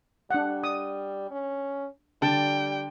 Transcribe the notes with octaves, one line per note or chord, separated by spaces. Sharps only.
G3 D4 F#5
D#6
C#4
D3 G3 G5 A5